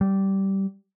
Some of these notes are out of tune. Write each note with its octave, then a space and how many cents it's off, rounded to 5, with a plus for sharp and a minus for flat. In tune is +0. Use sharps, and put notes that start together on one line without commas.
G3 -15